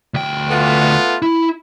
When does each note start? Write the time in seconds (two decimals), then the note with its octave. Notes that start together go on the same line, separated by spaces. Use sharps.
0.14 D2 G5
0.50 A3 B3 F4
1.22 E4